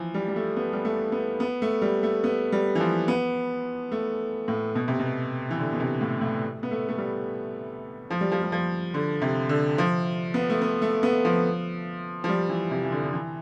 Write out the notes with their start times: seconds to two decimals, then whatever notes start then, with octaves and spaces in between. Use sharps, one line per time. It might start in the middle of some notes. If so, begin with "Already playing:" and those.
Already playing: E3 F3
0.14 G3
0.28 G3
0.36 A3
0.56 B3
0.73 G3
0.85 A3
1.12 B3
1.40 B3
1.62 A3
1.82 G3
2.03 A3
2.24 B3
2.52 G3
2.75 E3
2.80 F3
3.08 B3
3.92 A3
4.48 A2
4.75 B2
4.88 C3
5.00 B2
5.50 E3
5.59 D3
5.73 B2
5.80 C3
6.01 A2
6.21 A2
6.63 B3
6.71 A3
6.89 A3
6.98 G3
8.11 F3
8.21 G3
8.32 F3
8.42 G3
8.52 F3
8.94 D3
9.22 C3
9.49 D3
9.78 F3
10.34 B3
10.50 A3
10.62 B3
10.82 A3
11.03 B3
11.25 F3
12.24 F3
12.29 G3
12.49 E3
12.71 C3
12.85 E3
12.92 D3
13.03 D3
13.13 E3